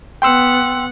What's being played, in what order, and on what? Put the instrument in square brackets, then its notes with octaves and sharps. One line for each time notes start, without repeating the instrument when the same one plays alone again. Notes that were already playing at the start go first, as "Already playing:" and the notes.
[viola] B3 F#5 [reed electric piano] G5 C6 E6